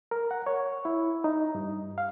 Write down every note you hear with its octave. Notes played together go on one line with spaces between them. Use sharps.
A#4
F#5
C#5
E4
D#4
G2
F5